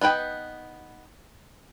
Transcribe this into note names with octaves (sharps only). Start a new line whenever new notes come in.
B3 D#4 B4 G5